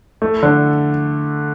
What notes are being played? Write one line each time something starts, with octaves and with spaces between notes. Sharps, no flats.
A3
D3